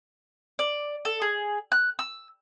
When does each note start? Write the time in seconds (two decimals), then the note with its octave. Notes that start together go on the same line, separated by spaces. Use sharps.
0.59 D5
1.05 A4
1.22 G#4
1.72 F#6
1.99 E6